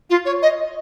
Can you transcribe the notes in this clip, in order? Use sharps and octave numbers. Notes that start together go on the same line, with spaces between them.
F4
C#5
D#5